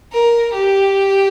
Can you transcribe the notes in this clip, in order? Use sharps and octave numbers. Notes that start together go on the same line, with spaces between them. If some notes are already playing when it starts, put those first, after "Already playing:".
A#4
G4